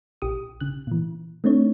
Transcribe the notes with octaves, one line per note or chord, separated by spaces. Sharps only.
A#1 G4 D#6
C#3 F#6
A#2 E3
A3 C4 D4 D#4 C#5